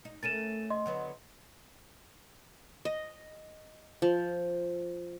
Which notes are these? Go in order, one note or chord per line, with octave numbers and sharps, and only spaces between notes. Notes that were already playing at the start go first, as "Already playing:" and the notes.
D#4
A3 C#4 A#4 A6 D#7 E7
D#5 C6
D3 F#3 B3
D#5
F3